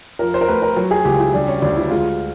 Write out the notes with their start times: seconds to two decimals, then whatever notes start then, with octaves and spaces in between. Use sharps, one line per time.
0.19 F3 A#4
0.34 C5
0.41 A#4
0.48 A3 B4
0.62 A#4
0.77 F#3
0.91 G#4
1.05 C#2 G4
1.19 E4
1.34 G3 D4
1.48 C#4
1.62 D2 D4
1.77 E4
1.91 G#3 F4